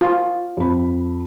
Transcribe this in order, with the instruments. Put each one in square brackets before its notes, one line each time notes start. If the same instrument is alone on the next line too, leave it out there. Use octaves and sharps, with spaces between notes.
[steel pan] F4
[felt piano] F2 B5